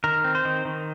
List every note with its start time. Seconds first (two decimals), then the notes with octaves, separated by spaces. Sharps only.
0.04 D#3 A#4
0.24 C4
0.35 C5
0.45 D#3
0.65 D#3